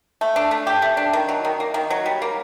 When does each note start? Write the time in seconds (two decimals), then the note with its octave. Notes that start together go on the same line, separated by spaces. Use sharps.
0.21 A3
0.36 D4
0.51 A3
0.67 G4
0.82 A3
0.97 D4
1.13 D#3
1.29 F#3
1.45 D#3
1.60 A#3
1.74 D#3
1.90 F#3
2.06 G3
2.22 A#3